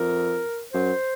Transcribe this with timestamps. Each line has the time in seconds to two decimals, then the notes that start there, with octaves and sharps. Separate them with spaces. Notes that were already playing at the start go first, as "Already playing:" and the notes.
Already playing: F2 A#4
0.73 F#2 C5